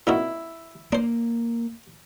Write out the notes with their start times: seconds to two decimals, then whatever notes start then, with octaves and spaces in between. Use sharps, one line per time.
0.07 A#2 D#4 E4 F#4
0.92 A#3 D4 C5